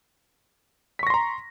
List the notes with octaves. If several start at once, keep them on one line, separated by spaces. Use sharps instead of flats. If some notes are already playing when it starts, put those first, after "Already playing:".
A#5 C6 C#6 A#6 B6